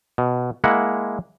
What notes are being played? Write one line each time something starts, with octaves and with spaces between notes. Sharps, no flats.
B2
G#3 A#3 E4 F#5